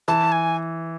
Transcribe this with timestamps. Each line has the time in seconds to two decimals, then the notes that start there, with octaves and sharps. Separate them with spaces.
0.08 E3 A5
0.32 G#5